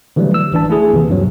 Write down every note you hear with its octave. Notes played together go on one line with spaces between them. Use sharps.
D3 E3 F#3 G3 A3
E6
G#1 E3 D4 A5
A3 E4 G#4
D#2 C3 E3
G2 C3 F#3